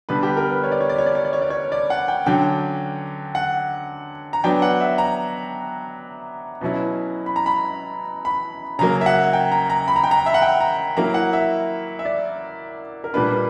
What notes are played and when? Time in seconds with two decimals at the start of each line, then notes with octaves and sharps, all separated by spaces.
0.09 D3 G3 B3 B4
0.23 G4
0.37 A#4
0.50 B4
0.64 C#5
0.72 D5
0.81 C#5
0.89 D5
0.98 C#5
1.06 D5
1.15 C#5
1.25 D5
1.33 C#5
1.42 D5
1.50 C#5
1.72 D5
1.90 F#5
2.08 G5
2.26 D3 F#3 C#4 G5
3.35 F#5
4.33 A#5
4.44 F#3 B3 D4 G5
4.62 F#5
4.81 E5
4.98 A#5
6.61 B2 F#3 C#4 E4
7.26 B5
7.36 A#5
7.46 B5
8.25 B5
8.79 C#3 F#3 A#3 A#5
9.01 E5
9.06 F#5
9.33 G5
9.52 A#5
9.70 A#5
9.88 B5
9.96 A#5
10.04 G5
10.11 A#5
10.26 E5
10.34 F#5
10.42 G5
10.61 A#5
10.97 F#3 A#3 E4 A#5
11.14 F#5
11.33 E5
11.99 E5
12.05 D5
13.04 A#4
13.14 A#2 G3 A#3 D4 B4